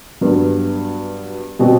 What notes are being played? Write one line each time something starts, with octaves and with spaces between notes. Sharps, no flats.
G2 F#3 B3
B2 G3 C4 F#4